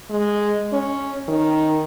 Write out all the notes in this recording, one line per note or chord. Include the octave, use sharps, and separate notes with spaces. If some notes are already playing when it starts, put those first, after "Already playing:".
G#3
C#4
D#3